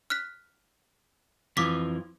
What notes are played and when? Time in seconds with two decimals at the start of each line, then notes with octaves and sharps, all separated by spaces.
0.10 F6 F#6 B6
1.57 F2 E3 F3 D6 B6